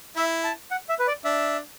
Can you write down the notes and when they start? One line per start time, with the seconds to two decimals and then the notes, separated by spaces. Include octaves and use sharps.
0.16 E4 E5
0.44 A5
0.71 F#5
0.89 E5
0.99 B4
1.07 D5
1.25 D4 E5